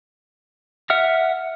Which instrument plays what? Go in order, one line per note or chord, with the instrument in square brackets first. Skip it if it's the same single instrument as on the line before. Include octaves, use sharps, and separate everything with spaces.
[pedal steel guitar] E5 F#5 F6